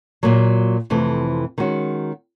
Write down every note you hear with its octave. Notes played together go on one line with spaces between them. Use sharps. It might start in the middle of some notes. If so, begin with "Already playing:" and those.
A#2 F#3 A#3
F2 C3 E3 A3
D#3 G#3 C#4 F#4